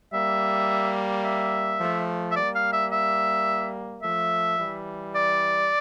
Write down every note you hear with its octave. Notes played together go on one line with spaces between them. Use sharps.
G3 A#3 E5
E5
F3 A3
E5
G3 A#3 D5
F5
E5
E5
F3 A3 E5
E3 G3
D5